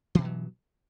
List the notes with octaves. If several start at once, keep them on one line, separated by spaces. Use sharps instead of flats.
G2 B2 E3 F#3